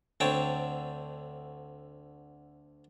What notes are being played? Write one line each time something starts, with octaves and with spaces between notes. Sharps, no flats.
D2 D3 C4 C#5 G5 A5